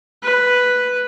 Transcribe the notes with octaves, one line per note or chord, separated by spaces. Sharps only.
B4